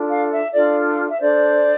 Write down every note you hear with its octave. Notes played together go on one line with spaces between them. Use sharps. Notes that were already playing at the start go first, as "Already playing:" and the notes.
Already playing: D4 F4 A4
F5
E5
D4 F4 A4 D5
E5
D4 A4 C5 D5